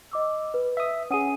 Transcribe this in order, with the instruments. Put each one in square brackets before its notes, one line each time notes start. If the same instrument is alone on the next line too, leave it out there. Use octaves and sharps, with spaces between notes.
[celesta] D#5 D6 E6
B4
[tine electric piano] E5 D#6
[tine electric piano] C#4 G#4 [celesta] F#5 D#6 D#7